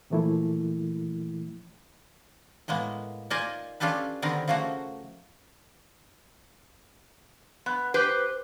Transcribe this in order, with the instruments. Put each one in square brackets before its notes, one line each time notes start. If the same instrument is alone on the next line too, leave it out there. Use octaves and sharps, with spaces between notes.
[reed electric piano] A#2 E3 F3 A3 A#3 E4
[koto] A2 G#3 A#3 B3
A#3 D#4 F4 D5 D#5 G#5
C#4 D4 F4 G4 A4 B4
D3 D#3 B3 C4 A#4
C#3 F3 A3 A#3 F#4
[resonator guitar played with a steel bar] B3
G4 B4 C5